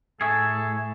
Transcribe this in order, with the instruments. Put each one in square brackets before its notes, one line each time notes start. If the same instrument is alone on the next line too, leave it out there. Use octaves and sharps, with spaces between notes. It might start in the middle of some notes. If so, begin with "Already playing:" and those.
[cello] A2 [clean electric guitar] G#4 E5 [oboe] A4 [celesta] G#5 C#6 E6